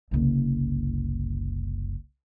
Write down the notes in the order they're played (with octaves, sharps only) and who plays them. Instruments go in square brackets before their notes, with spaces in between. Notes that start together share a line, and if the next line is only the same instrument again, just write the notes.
[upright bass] F#1 C2